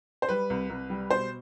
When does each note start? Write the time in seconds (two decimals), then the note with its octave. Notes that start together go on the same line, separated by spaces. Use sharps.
0.22 C5
0.29 G3 B4
0.50 C2
0.70 C2
0.90 G3
1.10 B2 C5